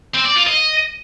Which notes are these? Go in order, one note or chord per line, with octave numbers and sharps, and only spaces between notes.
C4
D5
F4
D#5